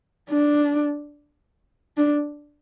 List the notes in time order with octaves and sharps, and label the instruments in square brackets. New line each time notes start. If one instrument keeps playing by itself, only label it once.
[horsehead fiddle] D4
D4